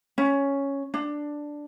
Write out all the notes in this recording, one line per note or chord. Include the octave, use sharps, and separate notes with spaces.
C#4
D4